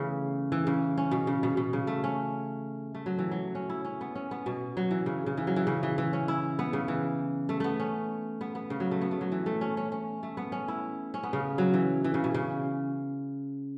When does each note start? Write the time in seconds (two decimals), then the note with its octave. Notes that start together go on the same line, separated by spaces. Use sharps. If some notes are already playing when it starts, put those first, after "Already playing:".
Already playing: C#3 E3 A3 B3
0.52 E3
0.67 C#3
0.97 C#4
1.11 B2
1.27 C#3
1.43 B2
1.57 B2
1.73 C#3
1.87 A3
2.04 C#4
2.95 A3
3.06 F#3
3.19 E3
3.31 F#3
3.55 C#4
3.69 E4
3.85 C#4
4.01 B3
4.15 C#4
4.31 B3
4.46 B2
4.77 F#3
4.91 E3
5.06 C#3
5.26 C#3
5.37 E3
5.47 F#3
5.56 E3
5.67 C#3
5.83 E3
5.98 E3
6.13 C#4
6.28 E4
6.59 B3
6.73 C#3
6.88 E3
7.49 A3
7.60 A3 B3
7.80 C#4
8.41 B3
8.55 B3
8.70 C#3
8.80 F#3
8.91 A3
9.01 B3
9.11 A3
9.21 F#3
9.32 E3
9.46 A3
9.61 C#4
9.77 C#4
9.92 C#4
10.23 A3
10.37 B3
10.52 C#4
10.68 E4
11.14 C#4
11.23 B3
11.33 C#3
11.58 F#3
11.74 E3
12.04 E3
12.14 C#3
12.24 B2
12.35 C#3